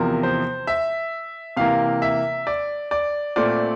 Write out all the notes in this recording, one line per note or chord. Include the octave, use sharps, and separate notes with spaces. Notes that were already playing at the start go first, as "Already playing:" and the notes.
Already playing: E2 C3 F3 A#4
C5
E5
C3 E3 A#3 F5
E5
D5
D5
A#2 A3 C4 D5